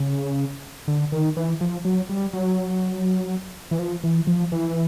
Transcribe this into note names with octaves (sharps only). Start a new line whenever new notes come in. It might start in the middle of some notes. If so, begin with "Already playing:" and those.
Already playing: C#3
D3
D#3
E3
F3
F#3
G3
F#3
E3
F3
E3
F3
E3